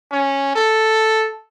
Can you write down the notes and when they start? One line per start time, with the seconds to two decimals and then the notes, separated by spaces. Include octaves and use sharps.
0.11 C#4
0.55 A4